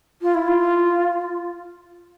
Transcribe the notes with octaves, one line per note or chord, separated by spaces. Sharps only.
F4
E4
F4